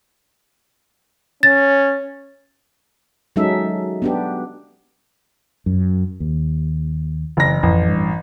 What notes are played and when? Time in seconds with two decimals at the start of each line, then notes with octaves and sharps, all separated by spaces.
1.43 C#4 A6
3.36 F#3 G#3 C#4 D#4 A4 E5
4.02 B3 D4 G4
5.66 F#2
6.20 D#2
7.37 F#1 E3 A#6
7.63 A1 F2
7.88 G2